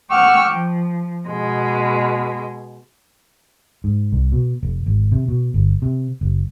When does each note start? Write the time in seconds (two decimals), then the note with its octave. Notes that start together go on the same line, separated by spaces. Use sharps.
0.11 F#5 G5 C#6 D6 E6 F6
0.49 F3
1.28 B2 G#3
3.84 G#2
4.12 C2
4.32 B2
4.63 F1
4.86 G#1
5.12 C3
5.28 B2
5.54 G1
5.82 C3
6.21 F#1